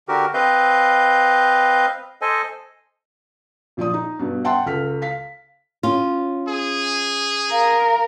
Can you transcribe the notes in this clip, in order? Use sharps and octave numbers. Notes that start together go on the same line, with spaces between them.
D3 F#4 G4 A#4
C4 B4 D#5 F5 G6
A4 C5 D#5 G#5
A#1 F3 D5 D#6
D#4
G2 B2
E5 F#5 G5 A5 C6
C#2 A4 F6 B6
F5 B6
C#4 F4
G#4
A#4 F5